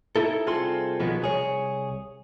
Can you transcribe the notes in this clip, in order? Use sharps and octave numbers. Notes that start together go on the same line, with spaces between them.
D#4 E4 A4
C2 C4 F4 G#4 A4 C6
B1 B2 D#3 F3 G#3 B3
C2 G#4 C#5